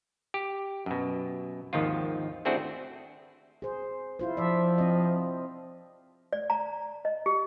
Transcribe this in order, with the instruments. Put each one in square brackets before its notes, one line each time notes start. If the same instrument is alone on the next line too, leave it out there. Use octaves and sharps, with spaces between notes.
[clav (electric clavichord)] G4
F#2 B2
G#1 D#2 D#3 F3 F4
A3 C4 D4 E4 F#4 G#4
[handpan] G#4 C5
E4 F4 C5
[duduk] F3 [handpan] D5 E5
[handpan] C4 D#5
[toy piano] D5
A#5
D#5
G4